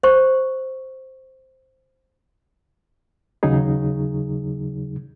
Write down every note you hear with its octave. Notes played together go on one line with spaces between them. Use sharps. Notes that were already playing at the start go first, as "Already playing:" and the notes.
C5 C#6
D#2 C#3 F#3 D#4 G#4